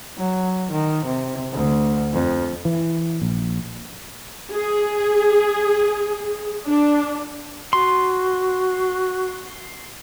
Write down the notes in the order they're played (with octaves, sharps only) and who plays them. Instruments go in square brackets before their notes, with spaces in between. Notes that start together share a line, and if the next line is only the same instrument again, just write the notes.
[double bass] F#3
D#3
C3
D2
F2
[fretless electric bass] E3
A#1
[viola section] G#4
D4
[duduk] F#4 [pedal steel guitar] C6